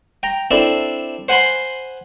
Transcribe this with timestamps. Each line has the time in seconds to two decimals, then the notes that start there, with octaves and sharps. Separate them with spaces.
0.23 G5 A#5
0.51 C4 D4 E4 A4
1.29 C5 F#5 G#5 B5 C6